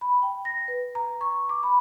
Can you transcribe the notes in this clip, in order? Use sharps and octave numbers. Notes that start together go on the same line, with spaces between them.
B5
G5
A#6
B4
A#5
C#6
D6
B5